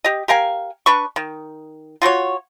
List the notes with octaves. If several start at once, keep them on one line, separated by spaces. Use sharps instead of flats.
G4 D#5
G4 A#4 F5 G#5
D4 B4 C#6
D#3
F4 F#4 C5 C#5